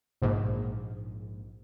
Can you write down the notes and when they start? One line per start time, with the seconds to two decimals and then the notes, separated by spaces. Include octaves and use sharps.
0.22 A#1 G#2